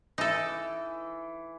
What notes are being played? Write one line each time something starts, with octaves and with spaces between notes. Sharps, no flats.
E3 D#4 A4